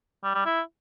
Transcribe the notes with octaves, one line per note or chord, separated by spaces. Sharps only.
G3
G3
E4